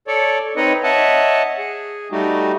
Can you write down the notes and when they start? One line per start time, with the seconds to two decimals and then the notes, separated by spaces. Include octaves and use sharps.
0.07 A4 C#5 D5
0.57 C4 D#4 B4 C#5 D#5
0.83 C#5 D#5 E5 F#5 A5
1.58 G#4
2.12 G3 A3 D#4 F#4 G4